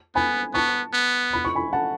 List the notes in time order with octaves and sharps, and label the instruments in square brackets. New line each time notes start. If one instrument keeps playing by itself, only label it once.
[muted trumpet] B3 [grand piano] G#5 B5
[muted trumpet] B3 [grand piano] A5 C#6
[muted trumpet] B3
[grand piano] B5
C#6
G#5 B5
F#5 A5